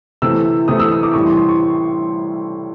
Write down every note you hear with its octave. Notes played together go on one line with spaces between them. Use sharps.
C3 E3 A3 E6
C3 E3 A3 D#6
E6
D#6
D6
A2 E3 G3 C#6
C6
C6
C#6